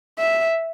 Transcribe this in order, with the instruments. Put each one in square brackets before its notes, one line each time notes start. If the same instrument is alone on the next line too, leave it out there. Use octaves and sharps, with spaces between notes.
[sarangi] E5